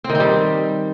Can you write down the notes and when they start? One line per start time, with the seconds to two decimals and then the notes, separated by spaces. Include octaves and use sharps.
0.04 C4
0.10 D#3
0.15 C4
0.20 G3